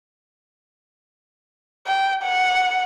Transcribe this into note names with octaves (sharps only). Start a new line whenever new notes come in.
G5
F#5